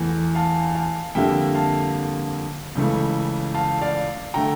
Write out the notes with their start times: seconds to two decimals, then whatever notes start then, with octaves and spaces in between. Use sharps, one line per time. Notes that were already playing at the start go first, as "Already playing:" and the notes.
Already playing: E2 E3 A3
0.35 F5 A5
0.75 F5 A5
1.15 F2 D3 G3 A#3 E5 G5
1.55 F5 A5
2.75 C#2 C#3 E3 A3
3.55 F5 A5
3.81 D5 F5
4.34 D3 A3 G5 A#5